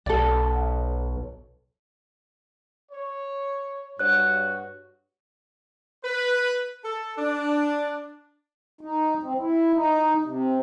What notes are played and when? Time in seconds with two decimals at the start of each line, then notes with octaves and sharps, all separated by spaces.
0.06 B1 A4 D5
2.92 C#5
3.99 G2 F#4 C#5 F#6
6.04 B4
6.83 A4
7.17 D4
8.81 D#4
9.23 C4
9.39 E4
9.74 D#4
10.24 C3